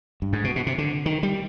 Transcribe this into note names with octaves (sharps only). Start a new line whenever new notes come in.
G2
G#2
B2
B2
C3
D3
D#3
G3